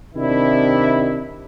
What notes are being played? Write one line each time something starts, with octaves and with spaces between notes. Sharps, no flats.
C3 D#3 D4 E4